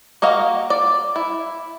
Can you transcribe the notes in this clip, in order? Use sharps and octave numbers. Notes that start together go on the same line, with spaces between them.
A#3 F#4 D#5 F5
D5
E4